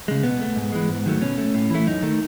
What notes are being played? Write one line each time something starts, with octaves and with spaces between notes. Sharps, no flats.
C#3 G#3
B2 B3
A3
G#2
E3 G#3
G#2
D#3 F#3 A3
B2 C#4
A3
A2
E3 A3 E4
F#2 D#4
D#3 A3